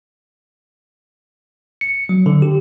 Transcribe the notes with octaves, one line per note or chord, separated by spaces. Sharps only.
C#7
F#3
D3
G4